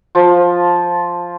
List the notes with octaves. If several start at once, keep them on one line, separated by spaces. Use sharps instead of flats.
F3 F4